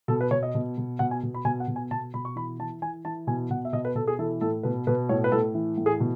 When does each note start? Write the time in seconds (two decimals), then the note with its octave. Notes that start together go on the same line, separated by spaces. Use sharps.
0.08 B2 A4
0.21 B4
0.31 B2 C#5
0.43 D#5
0.55 B2
0.78 B2
0.99 B2 F#5
1.11 G#5
1.23 B2
1.34 B5
1.45 B2 G#5
1.60 F#5
1.68 B2
1.76 G#5
1.91 B2 A5
2.14 B2 B5
2.25 C#6
2.36 E3 B5
2.59 E3 A5
2.82 E3 G#5
3.05 E3 A5
3.27 B2 G#5
3.50 B2 F#5
3.65 E5
3.73 B2 D#5
3.85 B4
3.95 B2 A4
4.08 G#4
4.19 E3 A4
4.41 A2 A4
4.63 B2 B4
4.87 B2 B4
5.09 A2 C#5
5.24 B4
5.32 A2 A4
5.54 E3
5.77 A2
5.86 G#4
6.00 B2